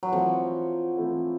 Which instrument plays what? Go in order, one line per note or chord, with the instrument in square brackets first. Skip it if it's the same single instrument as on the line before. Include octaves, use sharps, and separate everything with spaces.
[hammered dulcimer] F#3
[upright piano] E3 A3 C4 E4 [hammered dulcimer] F3
[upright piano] E3 A3 C4 E4